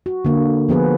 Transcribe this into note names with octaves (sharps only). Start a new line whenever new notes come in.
F#4
D3 A#3
F3 B3 G#4 B4